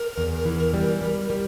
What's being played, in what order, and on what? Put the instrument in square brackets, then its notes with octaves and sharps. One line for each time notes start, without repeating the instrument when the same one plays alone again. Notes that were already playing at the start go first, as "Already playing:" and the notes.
Already playing: [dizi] A#4
[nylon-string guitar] E2
E3
G3
G3
G3